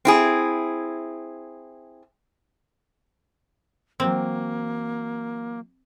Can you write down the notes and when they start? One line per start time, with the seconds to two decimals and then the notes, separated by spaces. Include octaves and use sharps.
0.05 C4 E4 G#4
4.00 E3 F#3 A#3 C4